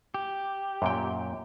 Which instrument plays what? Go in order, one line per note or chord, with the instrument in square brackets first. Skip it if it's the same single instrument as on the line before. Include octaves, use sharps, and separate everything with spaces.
[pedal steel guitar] G4
[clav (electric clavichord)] F#2 A#2 G5